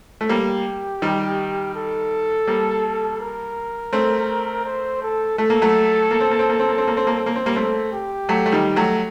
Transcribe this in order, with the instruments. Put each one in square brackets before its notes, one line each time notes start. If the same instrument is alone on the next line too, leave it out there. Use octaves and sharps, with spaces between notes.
[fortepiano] A3
[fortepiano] G3 A#3 [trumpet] G4
[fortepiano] D#3 G3
[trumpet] A4
[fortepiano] G3 A#3
[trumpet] A#4
[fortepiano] A3 C4
[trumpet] C5
A4
[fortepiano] A3 [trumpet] A4
[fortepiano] A#3
F#3 A3
A#3
C4
A#3
C4
A#3
C4
A#3
C4
A#3
C4
A#3
C4
A#3
C4
G3 A#3
[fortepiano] A3 C4 [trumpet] A4
[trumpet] G4
[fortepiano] F#3 A3
A3
D#3 G3
F#3 A3